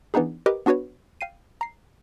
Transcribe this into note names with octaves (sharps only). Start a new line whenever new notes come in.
E3 B3 D4 D#4 G#4
G4 A#4 B4 D#5 D6
B3 D4 F#4 B4 C#5
F5 G5 C7 D#7
A#5 C7